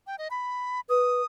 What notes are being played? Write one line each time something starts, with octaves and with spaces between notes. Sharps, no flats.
G5
D#5
B5
B4 D#6